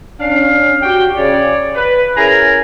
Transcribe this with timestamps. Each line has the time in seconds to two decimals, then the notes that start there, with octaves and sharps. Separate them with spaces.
0.20 C#4 D4 F5
0.82 F#4 G4 G5
1.16 C#3 C#5 D5
1.75 B4
2.17 C#4 E4 G#4 A#4 G#5 A#5